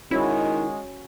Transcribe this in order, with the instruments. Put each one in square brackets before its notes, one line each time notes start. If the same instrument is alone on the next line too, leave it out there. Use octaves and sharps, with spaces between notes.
[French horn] D#3 [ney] G#3 [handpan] C#4 F#4 C#5 [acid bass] E4